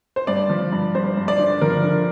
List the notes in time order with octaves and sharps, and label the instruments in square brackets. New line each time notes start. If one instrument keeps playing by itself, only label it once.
[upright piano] C5
G2 D5
F3
G2
G2 C5
G2
D5
D3
F3 A#4
D3